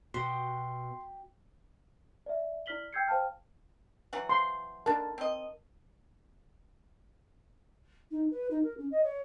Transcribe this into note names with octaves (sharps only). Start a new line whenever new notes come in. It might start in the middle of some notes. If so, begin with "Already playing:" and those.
B2 F#4 G4 C6
D5 E5
E4 D5 F6 B6 F#7 G7
G5 E6 G6 G#6 C7 C#7
C5 F5 G5 A5 F6
E3 F#3 F#5
C6
D3 D4 A#4 A5
C4 D#5
D#4
B4
D#4
A#4
C#4
D#5
C#5